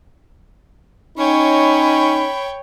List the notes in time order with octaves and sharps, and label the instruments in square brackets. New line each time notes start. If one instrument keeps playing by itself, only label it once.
[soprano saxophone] C#4 [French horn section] D#4 [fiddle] C#5 G5 [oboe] B5